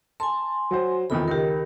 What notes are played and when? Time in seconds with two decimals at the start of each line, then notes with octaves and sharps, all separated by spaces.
0.20 G#5 A5 C6
0.71 F#3 F#4 C5
1.10 F1 E2 D#3 F4 B5
1.28 C#2 D#3 G4 A#4